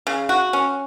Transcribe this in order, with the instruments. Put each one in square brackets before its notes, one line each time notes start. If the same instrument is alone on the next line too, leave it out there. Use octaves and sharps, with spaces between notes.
[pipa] C#3
F#4
C#4